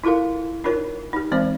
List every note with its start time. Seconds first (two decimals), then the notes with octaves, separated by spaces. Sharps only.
0.04 E4 F4 A4 A#4 F5
0.64 D4 D#4 F4 A#4 C#5
1.13 D#4 G4
1.31 E3 G#3 C4 C5 D5